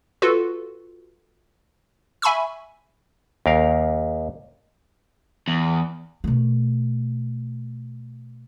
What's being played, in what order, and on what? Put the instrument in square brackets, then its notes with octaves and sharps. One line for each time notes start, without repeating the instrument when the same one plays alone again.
[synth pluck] F4 F#4 A4 B4
E5 G#5 B5 C#6 E6
[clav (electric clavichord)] D#2 A#4 F5
[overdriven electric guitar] E2
[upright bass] B2 A3